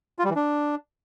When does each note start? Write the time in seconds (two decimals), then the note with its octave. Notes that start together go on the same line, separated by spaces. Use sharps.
0.19 F4
0.24 G3
0.30 E3
0.36 D4